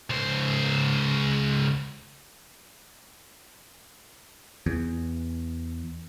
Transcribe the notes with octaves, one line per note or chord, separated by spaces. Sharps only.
C#2 C5
E2